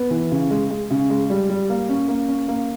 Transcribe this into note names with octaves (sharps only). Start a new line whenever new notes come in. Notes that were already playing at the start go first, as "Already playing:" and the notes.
Already playing: B3
E3
C#3
G#3
G#3
C#3
G#3
G3
G3
A#3
C#4
A#3
C#4
A#3